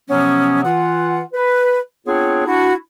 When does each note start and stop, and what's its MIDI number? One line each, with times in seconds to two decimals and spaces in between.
0.09 0.62 48
0.09 0.62 53
0.09 0.62 54
0.09 0.62 59
0.09 0.62 61
0.64 1.20 52
0.64 1.20 65
0.64 1.20 78
1.34 1.79 71
2.06 2.44 59
2.06 2.44 60
2.06 2.44 62
2.06 2.44 65
2.06 2.44 68
2.06 2.44 73
2.46 2.73 62
2.46 2.73 64
2.46 2.73 66